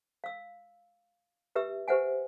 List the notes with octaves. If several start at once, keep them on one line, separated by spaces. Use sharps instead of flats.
F5 E6
G4 B4 E5 E6
G4 B4 C5 E5 F#5 G#5